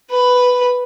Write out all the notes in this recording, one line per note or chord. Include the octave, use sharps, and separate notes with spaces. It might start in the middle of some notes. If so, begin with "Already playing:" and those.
B4